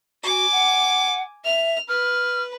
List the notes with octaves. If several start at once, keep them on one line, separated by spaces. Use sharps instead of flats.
F#4 G#5 D6
F#5
E5 F6
B4 F6